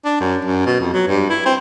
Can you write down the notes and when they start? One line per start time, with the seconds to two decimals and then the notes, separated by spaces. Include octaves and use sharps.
0.05 D4
0.21 F#2
0.45 F#2
0.66 B2
0.81 F2
0.94 F#3
1.08 G2
1.30 E4
1.46 C4